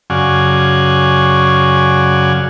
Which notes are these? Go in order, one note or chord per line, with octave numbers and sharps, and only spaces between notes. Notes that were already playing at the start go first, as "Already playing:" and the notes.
F#2 C#3 D5 F5 F#5 G#5